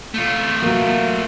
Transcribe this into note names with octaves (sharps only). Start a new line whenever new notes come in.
A3 F4
F#3 A#3